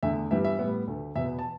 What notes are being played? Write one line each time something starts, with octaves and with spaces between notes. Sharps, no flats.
E2 D3 A3 E5
G2 E3 G3 B3 E5
E5
A2 G3 B3
D2 D3 A3
E2 B2 B3 E5
A5